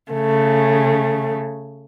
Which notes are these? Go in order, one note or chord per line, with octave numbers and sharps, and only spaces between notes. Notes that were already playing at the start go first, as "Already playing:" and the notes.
C#3 A3